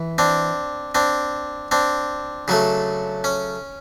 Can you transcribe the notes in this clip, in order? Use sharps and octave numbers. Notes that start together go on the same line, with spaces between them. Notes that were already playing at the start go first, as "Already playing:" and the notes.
Already playing: E3
C4 D4
C4 D4
C4 D4
C#3 F#3 A3
C#4